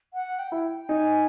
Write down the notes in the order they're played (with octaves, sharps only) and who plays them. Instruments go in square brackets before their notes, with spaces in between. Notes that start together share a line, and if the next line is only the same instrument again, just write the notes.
[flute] F#5
G5
[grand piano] E4
[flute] G5
[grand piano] D#4 [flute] G#5